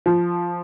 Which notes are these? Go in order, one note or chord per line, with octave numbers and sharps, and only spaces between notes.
F3